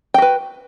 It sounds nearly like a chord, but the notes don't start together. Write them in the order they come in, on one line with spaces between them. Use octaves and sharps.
G5 F#4 B4